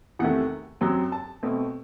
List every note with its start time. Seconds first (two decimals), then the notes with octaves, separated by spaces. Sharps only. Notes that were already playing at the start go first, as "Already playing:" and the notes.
0.19 E2 C3 D#3 A3 F#5
0.81 F#2 F#3 C4
1.12 A5
1.43 B2 A3 C4